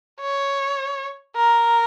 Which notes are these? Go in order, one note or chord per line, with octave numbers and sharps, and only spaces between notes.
C#5
A#4